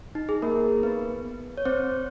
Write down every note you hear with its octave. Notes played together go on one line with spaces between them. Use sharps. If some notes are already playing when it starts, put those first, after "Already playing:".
D#4
G#4
A#3 A#4
B3 B4
C#5
C4 C5